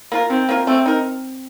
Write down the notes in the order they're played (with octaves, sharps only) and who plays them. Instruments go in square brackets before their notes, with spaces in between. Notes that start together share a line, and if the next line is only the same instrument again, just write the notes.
[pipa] A#3 F4 A#4
[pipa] D#3 [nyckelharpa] C4
[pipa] A#3 F4 A#4
[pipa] A3 [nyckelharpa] C4
[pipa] D#4 A#4